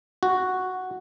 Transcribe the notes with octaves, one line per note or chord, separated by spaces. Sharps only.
F#4